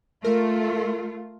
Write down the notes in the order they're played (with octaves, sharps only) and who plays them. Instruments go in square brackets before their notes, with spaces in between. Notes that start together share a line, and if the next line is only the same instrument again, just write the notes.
[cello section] A3 F4 [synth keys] A#4